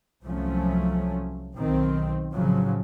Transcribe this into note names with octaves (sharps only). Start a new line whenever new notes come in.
C2 F3 F#3 A3 C#4
B1 D#3 C4
A2 C#3 F3 F#3